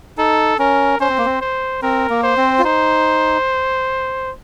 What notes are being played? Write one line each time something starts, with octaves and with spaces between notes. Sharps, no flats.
D#4 A4
C#4 A#4
C#4 C5
C4
A#3
C4
C5
C4 A#4
A#3
C5
C4
F4
D#4 C5